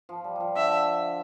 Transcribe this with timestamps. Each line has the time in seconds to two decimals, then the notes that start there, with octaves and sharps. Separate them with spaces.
0.09 F3
0.24 G3
0.36 F3 G3
0.56 D3 E5